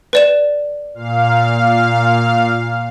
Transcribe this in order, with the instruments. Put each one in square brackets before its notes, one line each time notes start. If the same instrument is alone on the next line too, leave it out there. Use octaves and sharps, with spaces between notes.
[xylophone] B4 D5 E7
[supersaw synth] A#2 F5